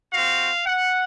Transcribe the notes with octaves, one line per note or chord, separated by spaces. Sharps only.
C4 F#4 F5
F#5